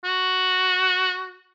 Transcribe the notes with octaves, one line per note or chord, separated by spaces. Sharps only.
F#4